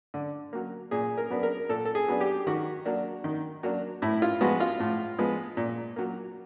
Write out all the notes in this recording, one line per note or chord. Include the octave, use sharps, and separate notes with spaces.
D3
F#3 A#3
A#2 G#4
A#4
F#3 B3 D4
A#4
A#2 A4
A4
G#4
F#3 B3 D4
G4
D#3 F#4
F#3 A#3 D4
D#3
F#3 A#3 D4
A2 E4
F4
F3 G#3 B3 F#4
F4
A2
F3 G#3 B3
A#2
F#3 A#3